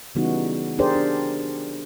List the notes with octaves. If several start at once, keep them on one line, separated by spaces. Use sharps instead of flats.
C#3 E3 G3 B3 D#4 F#4
D4 G4 G#4 A#4 C5 D5
D4